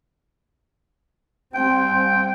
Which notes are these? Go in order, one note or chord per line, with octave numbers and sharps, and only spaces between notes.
G3 C4 G5